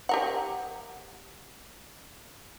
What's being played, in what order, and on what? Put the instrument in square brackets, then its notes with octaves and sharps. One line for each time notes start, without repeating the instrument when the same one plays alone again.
[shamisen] G4 A#4 F#5